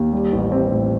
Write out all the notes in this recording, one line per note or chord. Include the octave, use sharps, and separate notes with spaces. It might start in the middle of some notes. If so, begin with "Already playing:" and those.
Already playing: D#2
G3
A1
C4
A2